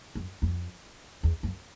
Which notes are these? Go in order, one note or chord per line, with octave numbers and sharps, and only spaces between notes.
F#2
F2
E2
F#2